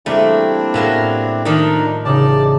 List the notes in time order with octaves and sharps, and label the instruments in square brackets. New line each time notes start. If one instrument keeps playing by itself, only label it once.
[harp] G3 A#3 [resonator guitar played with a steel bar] A3 [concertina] C4 D4 E4
[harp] A2 E5 E7 [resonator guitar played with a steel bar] F#3 A#3 B3
[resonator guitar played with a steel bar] D#3 F3 [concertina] D4 D#4 A#4
[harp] A1 C#3 D#4 [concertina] D5 A5